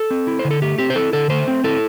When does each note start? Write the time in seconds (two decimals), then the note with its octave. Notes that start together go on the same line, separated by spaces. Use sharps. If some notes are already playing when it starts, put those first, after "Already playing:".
Already playing: A4
0.11 C4
0.27 E4
0.39 C5
0.45 D3
0.51 A4
0.62 A3 G4
0.78 C4 G4
0.90 C5
0.96 E4 A4
1.13 D3 A4
1.30 A3 C5
1.48 C4
1.64 E4 A4